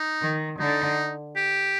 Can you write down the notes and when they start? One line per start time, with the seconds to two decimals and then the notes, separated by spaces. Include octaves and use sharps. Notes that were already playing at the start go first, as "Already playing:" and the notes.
Already playing: D#4
0.21 D#3
0.59 D3 D#4
1.36 G4